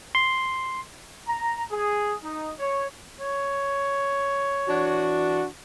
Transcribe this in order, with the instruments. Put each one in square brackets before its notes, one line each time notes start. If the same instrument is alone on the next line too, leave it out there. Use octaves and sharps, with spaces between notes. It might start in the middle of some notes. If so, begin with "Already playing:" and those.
[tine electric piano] C6
[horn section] A#5
G#4
D#4
C#5
[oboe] C#5
[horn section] E3 D4 F#4